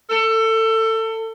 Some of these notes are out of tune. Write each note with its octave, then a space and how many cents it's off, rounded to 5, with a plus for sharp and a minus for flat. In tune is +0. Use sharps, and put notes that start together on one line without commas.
A4 +25